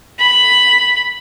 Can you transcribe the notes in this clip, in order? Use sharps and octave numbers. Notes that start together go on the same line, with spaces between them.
B5